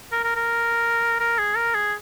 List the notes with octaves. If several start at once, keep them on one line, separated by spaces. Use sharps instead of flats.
A#4
A#4
A#4
A#4
G#4
A#4
G#4